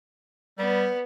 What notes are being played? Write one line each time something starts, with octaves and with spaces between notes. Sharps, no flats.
G3 B3